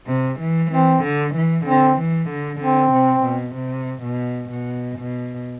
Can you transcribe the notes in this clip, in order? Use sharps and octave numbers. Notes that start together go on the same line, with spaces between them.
C3
E3
E3 C4
D3
E3
D3 C4
E3
D3
D3 C4
C3
B2
C3
B2
B2
B2